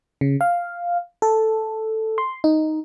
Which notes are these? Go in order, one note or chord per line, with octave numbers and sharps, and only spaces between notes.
C#3
F5
A4
C6
D#4